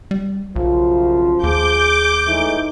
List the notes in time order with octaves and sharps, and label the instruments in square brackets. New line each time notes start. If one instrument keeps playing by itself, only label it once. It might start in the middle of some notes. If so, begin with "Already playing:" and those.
[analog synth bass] G3
[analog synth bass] B1 [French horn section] F#2 C#3 F4 [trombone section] F3 C5
[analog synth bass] D#2 [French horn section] G#4 [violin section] D6 G6
[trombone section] A2 G#3 A3 [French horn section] E3 D#4